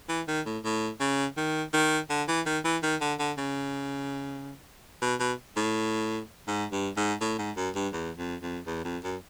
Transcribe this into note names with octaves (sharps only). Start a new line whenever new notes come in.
E3
D#3
A2
A2
C#3
D#3
D#3
D3
E3
D#3
E3
D#3
D3
D3
C#3
B2
B2
A2
G#2
G2
G#2
A2
G#2
F#2
G2
E2
F2
F2
E2
F2
F#2